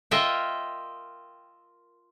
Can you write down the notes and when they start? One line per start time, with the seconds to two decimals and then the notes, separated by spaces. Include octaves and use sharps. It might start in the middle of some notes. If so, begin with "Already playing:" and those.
0.11 F4 A#4 D#5 E5 G5